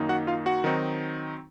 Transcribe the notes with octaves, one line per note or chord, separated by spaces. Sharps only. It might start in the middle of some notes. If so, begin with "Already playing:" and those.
Already playing: F#2 D#3 A#3 D#4
F#4 F#5
F4 F5
F#4 F#5
D#3 F#3 C4 D#4